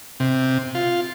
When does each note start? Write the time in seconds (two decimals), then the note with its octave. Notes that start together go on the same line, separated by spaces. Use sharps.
0.20 C3
0.75 F4